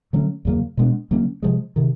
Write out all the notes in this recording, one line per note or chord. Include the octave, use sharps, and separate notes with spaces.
D3 F#3 A3 C#4
E2 C#3 F#3 A#3
B2 G#3 B3 D4
C#3 F#3 A#3 C#4
C3 F3 G#3
C3 D#3